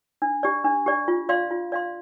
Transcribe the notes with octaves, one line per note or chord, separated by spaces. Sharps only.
D4
G4 D5
D4
G4 D5
F4
D5 F5 C6
F4
D5 F5 C6